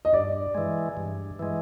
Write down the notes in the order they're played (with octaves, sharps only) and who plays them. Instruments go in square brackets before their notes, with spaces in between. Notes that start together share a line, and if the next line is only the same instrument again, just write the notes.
[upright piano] D#5
[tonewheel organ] G2 [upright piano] D5
[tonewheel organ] E3 G#3
G2
E3 G#3